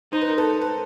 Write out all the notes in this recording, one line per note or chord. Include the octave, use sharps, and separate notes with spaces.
D#4 C5
B4
A#4
A4 B4
B4